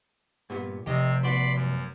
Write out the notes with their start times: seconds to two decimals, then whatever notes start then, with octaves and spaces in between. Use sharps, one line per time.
0.50 G2 A#2 B3
0.86 F1 C3 G4 D#5
1.23 B3 F#4 C5 D5 B5 C6
1.55 F#2